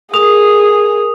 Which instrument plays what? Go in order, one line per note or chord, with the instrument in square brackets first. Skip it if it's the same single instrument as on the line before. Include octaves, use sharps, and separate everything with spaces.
[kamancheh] G#4 [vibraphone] A#4 [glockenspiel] D#6 F7